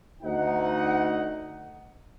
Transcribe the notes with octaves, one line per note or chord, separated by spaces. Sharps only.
D2 D#4 F#5